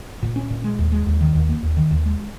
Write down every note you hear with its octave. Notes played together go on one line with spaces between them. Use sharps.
A#2
C#4
A#2
G#3
D#2
G#3
D#2
D#3
D#2
A#3
D#2
D#3
D#2
G#3